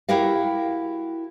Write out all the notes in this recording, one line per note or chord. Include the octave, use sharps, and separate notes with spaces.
E4 F#4 G4 A#4 F5